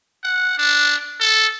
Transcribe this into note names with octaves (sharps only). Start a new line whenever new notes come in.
F#5
D4
A4